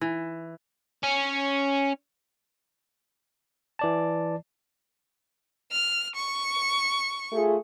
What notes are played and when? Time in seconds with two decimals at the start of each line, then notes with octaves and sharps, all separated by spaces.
0.01 E3
1.03 C#4
3.79 E3 D5 A5
5.72 F6
6.16 C#6
7.33 A3 F4 G#4